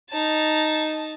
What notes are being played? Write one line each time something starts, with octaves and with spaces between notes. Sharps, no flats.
D#4 A5